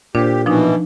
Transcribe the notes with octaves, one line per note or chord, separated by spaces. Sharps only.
A#2 D4 G4 C5
B2 E3 F3 D4 D#4